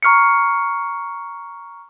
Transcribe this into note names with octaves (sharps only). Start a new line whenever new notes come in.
A#5 C#6 F6 C7 C#7